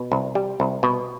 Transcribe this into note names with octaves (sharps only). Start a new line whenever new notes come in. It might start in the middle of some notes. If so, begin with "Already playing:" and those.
Already playing: B2
C2
G3
C2
B2